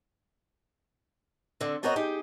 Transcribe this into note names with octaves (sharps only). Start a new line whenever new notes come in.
D3 C4
B3 C4 F#4 A#4 C#5 D#5
D#4 G4 G#4